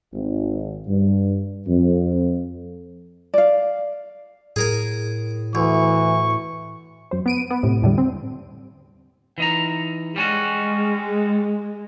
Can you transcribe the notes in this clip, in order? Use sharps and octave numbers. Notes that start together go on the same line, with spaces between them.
G#1
G2
F2
D5 F5
A2 G#4 A#4 G#5
D2 E3 C#6
F#2 C5
B3 D7 D#7
B3
A2 C3
E2 A2 D3 G3
C4
E3 D#4 A#5
G3 G#3 C#4 F#4